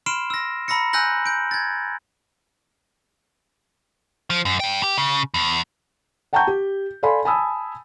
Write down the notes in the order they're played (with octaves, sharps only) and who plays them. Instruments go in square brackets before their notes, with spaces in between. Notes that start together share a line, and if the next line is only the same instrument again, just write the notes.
[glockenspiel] B5 C6 F6 C7 D7 E7
E6 A#6
A#5 B5 E6 A#6 C#7
G#5 E6 F#6 G6 A#6 F#7
G6 D7
G#6 A6
[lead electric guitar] F3
F#2
G2 G5
G4
C#3
E2
[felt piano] F#5 G5 A5 A#5 C#6 G6
G4
A4 D5 F5 G#5 B5 C6
G#5 A5 B5 D#6 E6